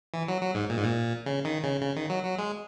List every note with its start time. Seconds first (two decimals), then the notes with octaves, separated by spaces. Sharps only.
0.14 E3
0.28 F#3
0.42 F#3
0.55 G#2
0.70 A#2
0.78 G#2
0.84 A#2
1.26 C#3
1.45 D#3
1.64 C#3
1.82 C#3
1.97 D#3
2.10 F#3
2.25 F#3
2.38 G#3